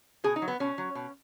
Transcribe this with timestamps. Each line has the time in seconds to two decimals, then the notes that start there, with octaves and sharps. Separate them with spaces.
0.24 B2 G#4
0.36 D#4
0.42 F#3
0.48 B3
0.60 B2 C#4
0.78 F#3
0.95 B2